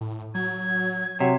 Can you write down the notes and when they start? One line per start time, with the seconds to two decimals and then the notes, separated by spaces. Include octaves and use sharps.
0.01 A2
0.35 F#3 G#6
1.20 C3 F#3